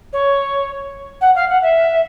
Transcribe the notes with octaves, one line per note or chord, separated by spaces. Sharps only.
C#5
F#5
F5
F#5
E5